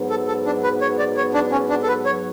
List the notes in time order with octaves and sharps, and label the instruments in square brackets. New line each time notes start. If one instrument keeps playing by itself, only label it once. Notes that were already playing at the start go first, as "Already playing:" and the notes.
Already playing: [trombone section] G#2 F#3 B3
[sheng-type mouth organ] A4
A4
D4
B4
C#5
D5
C#5
D4
C#4
D4
A4
B4
C#5